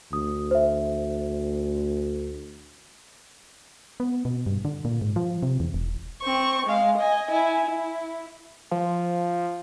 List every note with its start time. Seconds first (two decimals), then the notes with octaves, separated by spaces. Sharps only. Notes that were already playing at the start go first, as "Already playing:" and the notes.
0.13 D2 D#6
0.51 C5 E5
4.00 B3
4.25 B2
4.46 G2
4.65 D3
4.85 A#2
5.01 G#2
5.16 F3
5.43 C3
5.60 E2
5.74 E1
6.22 C4 C#6
6.66 G#3 F5
6.97 D#5 G#5
7.30 E4 G#5
7.65 E4
8.71 F3